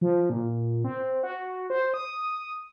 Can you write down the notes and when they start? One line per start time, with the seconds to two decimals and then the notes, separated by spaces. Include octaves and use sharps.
0.01 F3
0.30 A#2
0.84 C4
1.23 F#4
1.70 C5
1.94 D#6